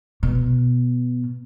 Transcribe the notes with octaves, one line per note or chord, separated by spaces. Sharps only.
B2